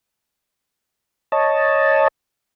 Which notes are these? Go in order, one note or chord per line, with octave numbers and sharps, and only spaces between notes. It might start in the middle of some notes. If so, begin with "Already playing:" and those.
C#5 D#5 A5